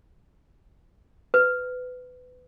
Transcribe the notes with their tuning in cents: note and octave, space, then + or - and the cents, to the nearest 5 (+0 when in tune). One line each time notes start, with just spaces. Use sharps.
B4 +25